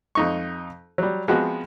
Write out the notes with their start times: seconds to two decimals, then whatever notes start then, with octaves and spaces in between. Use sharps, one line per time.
0.15 F2 D#4 C#6
0.98 F#3 G3
1.28 F3 G#3 B3 C4 F#4